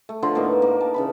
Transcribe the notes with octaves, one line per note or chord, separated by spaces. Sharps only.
A3
D3 F3 C6
A2 A#3 B3 D#4
A#3
A5
C#3 E3 B5